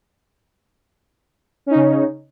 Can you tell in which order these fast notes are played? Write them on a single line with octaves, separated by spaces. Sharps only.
C#4 D#4 C#3